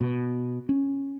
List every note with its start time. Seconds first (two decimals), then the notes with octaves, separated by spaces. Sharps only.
0.01 B2
0.69 C#4